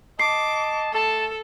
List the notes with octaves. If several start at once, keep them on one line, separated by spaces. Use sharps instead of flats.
D#5 A5 D6 C7
A3 A4 A5